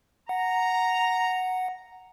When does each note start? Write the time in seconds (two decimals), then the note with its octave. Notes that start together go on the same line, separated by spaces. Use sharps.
0.29 F#5 A#5